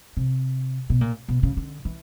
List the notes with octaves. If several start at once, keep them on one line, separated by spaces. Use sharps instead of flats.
C3
B2
A#2
B2
C#3
D3
E3